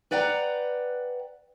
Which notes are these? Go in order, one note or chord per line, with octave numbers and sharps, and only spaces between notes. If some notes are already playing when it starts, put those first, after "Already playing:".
B4 D5 F#5 G5 A#5